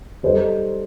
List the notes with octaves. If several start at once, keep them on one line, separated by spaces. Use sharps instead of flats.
G3 D#4 A4 C5